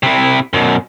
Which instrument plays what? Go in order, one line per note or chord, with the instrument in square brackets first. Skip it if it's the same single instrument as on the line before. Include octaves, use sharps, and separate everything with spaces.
[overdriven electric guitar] C3 E4
F#2 B2